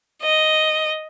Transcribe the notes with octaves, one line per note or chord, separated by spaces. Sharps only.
D#5